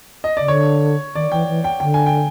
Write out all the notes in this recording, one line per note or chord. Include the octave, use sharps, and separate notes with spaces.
D#5
C#3 D5
D3 C#5
D#3 D5
E3 G5
E3
G5
D3 G5
G#5
G5